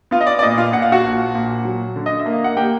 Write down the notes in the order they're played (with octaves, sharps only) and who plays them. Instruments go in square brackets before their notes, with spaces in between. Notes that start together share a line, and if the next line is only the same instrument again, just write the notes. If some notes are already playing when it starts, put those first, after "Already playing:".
[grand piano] B3 F4 F5
D#5
D5
D5
A#2 D#5
F4 F5
A#2 F#5
F5
F#4 F#5
A#1
A#2
F#3
D3
D#5
E5
A#3
F5
F#5
A#3 G4 G5